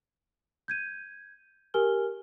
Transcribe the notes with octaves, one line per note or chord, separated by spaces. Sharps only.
G6 G#6 D#7
G4 A#4 G#5 F6 G7